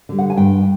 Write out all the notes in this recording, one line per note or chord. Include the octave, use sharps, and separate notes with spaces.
D3 G3
F#5
G#5
G2 G5